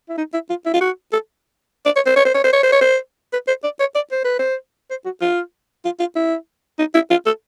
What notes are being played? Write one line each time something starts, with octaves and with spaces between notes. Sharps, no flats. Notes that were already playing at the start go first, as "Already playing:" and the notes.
E4
D#4
E4
F4
E4
F4
F#4
A4
D5
C#5
C5
C#5
C5
C#5
C5
C#5
C5
C#5
C5
B4
C5
D5
C#5
D5
C5
B4
C5
C5
F#4
F4
F4
F4
E4
D#4
E4
F4
A4